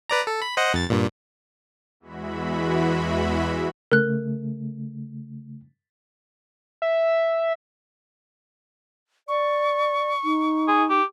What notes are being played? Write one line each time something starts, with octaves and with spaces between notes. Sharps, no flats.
B4 D5 A#5
A4
B5
C5 D#5 F#5
F2 A6
G2 A#2
E2 E3 G#3 F#4 E5 B5
C#3 A3 A#4 F#6
E5
D5 C#6
D#4
G#4
G4